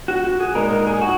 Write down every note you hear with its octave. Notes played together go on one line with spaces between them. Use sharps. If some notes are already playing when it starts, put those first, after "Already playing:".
F#4
F#4
G#4
A#2 G#3 D#4 A#4
A#4
G#4
F#4